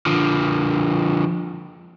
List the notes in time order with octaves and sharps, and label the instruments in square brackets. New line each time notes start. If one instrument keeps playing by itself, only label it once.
[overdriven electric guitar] D3 F3